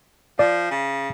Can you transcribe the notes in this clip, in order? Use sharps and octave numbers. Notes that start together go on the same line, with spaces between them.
F3 D5
C#3